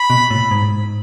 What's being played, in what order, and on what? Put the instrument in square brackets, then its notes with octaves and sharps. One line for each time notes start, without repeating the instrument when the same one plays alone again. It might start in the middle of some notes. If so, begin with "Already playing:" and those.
Already playing: [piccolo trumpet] B5
[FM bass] B2
A2
G#2